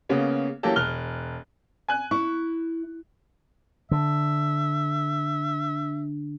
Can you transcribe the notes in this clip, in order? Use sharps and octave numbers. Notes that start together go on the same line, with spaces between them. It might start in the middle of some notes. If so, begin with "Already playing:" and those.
C#3 A#3 B3 C#4
E3 F#3 A#3 C#4 G4 A4
E1 F6 F#6 G7
G#5 F#6
E4 C#6
D3 E5